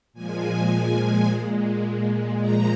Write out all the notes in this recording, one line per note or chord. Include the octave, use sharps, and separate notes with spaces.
A#2 F3 G#3 G#5
A#2 G#3
A#2 F3 G#3 A#5